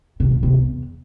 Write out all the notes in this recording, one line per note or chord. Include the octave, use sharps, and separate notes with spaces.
C3
A#2
C3
E2